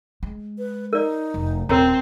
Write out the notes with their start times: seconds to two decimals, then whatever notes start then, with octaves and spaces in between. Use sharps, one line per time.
0.23 G#3
0.58 B4
0.93 D#4 A#4 D5
1.34 F1
1.69 D#1 C4 A#4 C#5 A#5